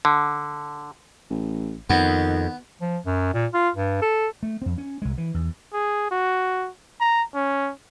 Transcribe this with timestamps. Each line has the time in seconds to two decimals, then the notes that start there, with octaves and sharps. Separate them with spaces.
0.05 D3
1.30 A1
1.90 F2 D#3 B3
2.82 F3
3.06 F#2
3.34 A#2
3.54 F4
3.75 G2
4.02 A4
4.43 A3
4.62 F2 C4
4.78 C#4
5.02 C2 G#3
5.18 E3
5.34 E2
5.73 G#4
6.11 F#4
7.00 A#5
7.34 C#4